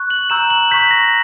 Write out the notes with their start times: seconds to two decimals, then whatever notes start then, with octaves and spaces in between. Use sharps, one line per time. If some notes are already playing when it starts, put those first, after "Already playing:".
Already playing: C#6 F#6
0.10 F#7
0.30 A#5 C#6 E6 G6 E7
0.50 F#7
0.71 C#6 G6 B6
0.91 A#6